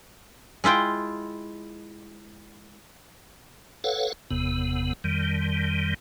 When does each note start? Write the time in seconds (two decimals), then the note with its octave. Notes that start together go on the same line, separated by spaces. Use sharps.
0.64 G#3 E4 F4 G5
3.84 A4 B4 C#5 F5 F#5
4.31 F#1 E2 C3 B3
5.04 F2 D#3 G3